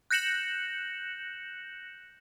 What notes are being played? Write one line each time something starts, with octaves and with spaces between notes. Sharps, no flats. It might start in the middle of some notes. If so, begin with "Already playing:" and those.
F#6 G6 A#6 C#7 E7 F#7